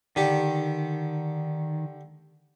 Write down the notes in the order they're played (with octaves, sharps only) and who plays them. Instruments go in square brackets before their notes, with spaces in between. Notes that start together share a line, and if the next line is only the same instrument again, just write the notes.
[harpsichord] D3 G4 [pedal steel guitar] D#3